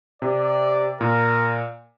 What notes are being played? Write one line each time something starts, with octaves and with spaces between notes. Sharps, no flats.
C3 D5
A#2 A#4